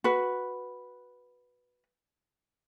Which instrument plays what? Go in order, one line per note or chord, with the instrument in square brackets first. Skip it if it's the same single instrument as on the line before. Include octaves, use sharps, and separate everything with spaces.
[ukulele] F#4 B4